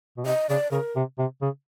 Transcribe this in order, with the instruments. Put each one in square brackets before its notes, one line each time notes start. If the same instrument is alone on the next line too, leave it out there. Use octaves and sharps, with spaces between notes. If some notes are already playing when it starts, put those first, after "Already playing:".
[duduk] B2
[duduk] C3 [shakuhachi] D#5
[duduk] C#3 [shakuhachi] D5
[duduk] C#3 [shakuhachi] A#4
[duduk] C3
C3
C#3